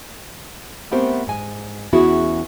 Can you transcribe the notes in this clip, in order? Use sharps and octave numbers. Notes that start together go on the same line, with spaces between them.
A3 B3 C4 G4 A#4 C5
G#2 G#5
E2 B3 C#4 E4 F#4 G#4